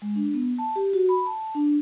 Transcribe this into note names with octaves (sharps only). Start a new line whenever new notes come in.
G#3
D4
B3
A5
G4
F#4
B5
A5
D4